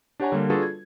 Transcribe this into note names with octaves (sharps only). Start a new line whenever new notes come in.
D4 G4 C#5 F#5 G#5 A#5
D3 G3 A#3
D4 F4 F#4 G#4 A4 B4
G#6